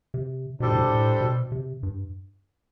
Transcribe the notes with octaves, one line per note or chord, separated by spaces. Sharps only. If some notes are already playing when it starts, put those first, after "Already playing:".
C3
B2 G3 D4 A4 C5
A2
B2
A2
B2
C3
G2